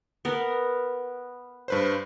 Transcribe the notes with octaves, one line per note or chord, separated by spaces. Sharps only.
B3 A#4
G2 B4 C5